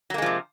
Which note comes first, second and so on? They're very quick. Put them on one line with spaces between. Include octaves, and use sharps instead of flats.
F#3 A#3 G#3 F3 C3